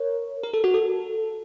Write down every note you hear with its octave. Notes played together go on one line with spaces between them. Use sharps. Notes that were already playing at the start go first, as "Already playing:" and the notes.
Already playing: A#4 C#5
A#4
A4
F#4
A4